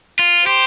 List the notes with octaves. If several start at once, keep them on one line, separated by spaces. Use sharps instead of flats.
F4
G4 C5